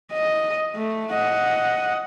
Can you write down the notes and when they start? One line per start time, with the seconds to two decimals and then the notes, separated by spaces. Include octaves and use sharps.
0.12 D#5
0.75 A3
1.13 D#5 F#5